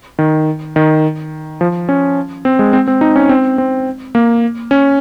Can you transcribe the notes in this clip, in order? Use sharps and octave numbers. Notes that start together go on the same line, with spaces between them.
D#3
D#3
F3
C#4
C4
G#3
C4
C4
D#4
C#4
C4
C4
A#3
C#4